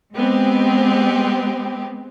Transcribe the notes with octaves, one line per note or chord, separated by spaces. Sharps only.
G#3 B3 C4 G4